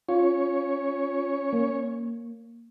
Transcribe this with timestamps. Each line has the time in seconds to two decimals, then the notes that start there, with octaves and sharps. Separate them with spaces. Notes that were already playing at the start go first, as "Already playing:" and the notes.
0.09 C#4 F4 C#5
1.53 A#3